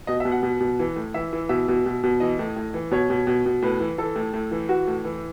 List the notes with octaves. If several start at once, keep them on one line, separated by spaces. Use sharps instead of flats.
B2 D#5
E5
B2
F#5
B2
B2
E3
A2
E3 E5
E3
B2 E5
B2
B2
B2
E3 D#5
A2
A2
E3
B2 C#5
B2
B2
B2
A2 B4
E3
E3 A4
A2
A2
E3
E3 F#4
A2
E3